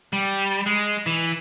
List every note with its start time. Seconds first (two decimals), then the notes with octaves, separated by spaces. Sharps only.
0.13 G3
0.66 G#3
1.06 E3